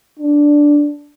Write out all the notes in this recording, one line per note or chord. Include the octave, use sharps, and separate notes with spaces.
D4